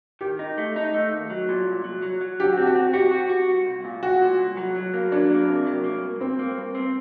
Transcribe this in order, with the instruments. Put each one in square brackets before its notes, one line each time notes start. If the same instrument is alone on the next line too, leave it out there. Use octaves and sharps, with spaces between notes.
[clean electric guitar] D#3 [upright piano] G4
[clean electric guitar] D#4
A3
D#4
A3
D#2
F#3
A#2
C2
F#3
F#3
F#3
[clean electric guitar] D3 [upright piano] G4
[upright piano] F#4
[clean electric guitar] C4 [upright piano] G4
[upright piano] F#4
[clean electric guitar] C4
[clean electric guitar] F#4 [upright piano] G4
[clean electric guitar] F#4
F#4
C2
C2
A#2
[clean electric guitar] C2 [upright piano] F#4
[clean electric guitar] A#2
C2
F#3
F#3
A#3
[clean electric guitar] F#3 [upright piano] D4
[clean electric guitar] A#3
C3
F#3
A#3
G2
[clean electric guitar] G2 [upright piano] C4
[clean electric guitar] A#3
G2
C4